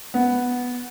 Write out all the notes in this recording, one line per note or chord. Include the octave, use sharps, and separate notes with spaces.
B3